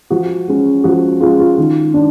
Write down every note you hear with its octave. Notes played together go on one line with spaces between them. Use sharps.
F3 F#4
G#3 C#4
F3 F#4
G#3 C#4 F4
F4
D#3
D4